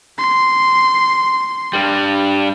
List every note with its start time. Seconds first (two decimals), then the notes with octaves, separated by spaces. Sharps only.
0.18 C6
1.74 G2 G3